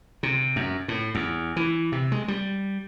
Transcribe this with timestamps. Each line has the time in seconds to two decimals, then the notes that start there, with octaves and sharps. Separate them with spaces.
0.23 C3
0.56 F#2
0.88 A2
1.15 E2
1.56 E3
1.92 C3
2.12 G#3
2.28 G3